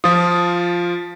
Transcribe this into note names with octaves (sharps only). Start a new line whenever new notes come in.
F3 F4 D#6